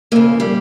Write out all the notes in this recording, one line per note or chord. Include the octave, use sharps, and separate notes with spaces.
F2 C#3 A#3
G3